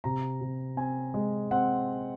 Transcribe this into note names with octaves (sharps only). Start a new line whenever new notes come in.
C3 A#5
C3
C4 G#5
G#3
C4 F#5